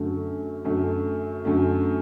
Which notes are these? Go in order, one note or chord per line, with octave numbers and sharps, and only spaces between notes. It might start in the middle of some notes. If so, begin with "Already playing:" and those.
Already playing: F#2 D3 A3
F#2 D3 A3
F#2 D3 A3